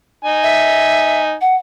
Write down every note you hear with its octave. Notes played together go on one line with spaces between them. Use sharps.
D#4 G#5
E5
F#5